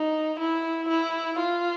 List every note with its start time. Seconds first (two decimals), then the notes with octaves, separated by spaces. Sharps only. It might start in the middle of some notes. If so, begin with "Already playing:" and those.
Already playing: D#4
0.39 E4
0.89 E4
1.39 F4